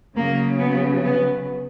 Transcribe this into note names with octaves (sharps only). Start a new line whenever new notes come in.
C#3 F#3 A#3
B3
B3